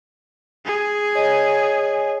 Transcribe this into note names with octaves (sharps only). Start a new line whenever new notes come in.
G#4
C#5 D#5 G#5